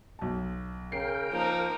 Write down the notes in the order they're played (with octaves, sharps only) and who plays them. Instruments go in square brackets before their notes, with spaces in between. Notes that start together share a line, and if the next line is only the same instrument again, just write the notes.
[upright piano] B1 A5
[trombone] C#3 [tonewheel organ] A#4 G5 [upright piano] C7
[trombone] F3 [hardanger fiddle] A#3 D#4